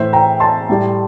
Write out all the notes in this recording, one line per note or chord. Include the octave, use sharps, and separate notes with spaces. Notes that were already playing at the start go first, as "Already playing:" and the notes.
Already playing: A2 E3 A3 C5 E5
G5 A#5
A5 C6
A2 G3